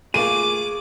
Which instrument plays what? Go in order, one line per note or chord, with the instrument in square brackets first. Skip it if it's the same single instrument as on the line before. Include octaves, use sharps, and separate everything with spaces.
[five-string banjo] A3 A#3 F4 [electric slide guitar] G#4 [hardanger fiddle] D6 [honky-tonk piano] D#7